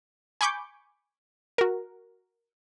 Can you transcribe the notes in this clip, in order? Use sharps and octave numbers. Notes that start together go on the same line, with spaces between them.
G#5 B5 C#6 D6 G6
F#4 A#4